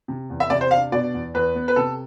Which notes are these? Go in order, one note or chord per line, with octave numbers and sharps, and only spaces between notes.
C3
E2
E5
C3 D5
C5
D4 F5
B2 D5
E2
E2 B4
B3
B4
C3 A4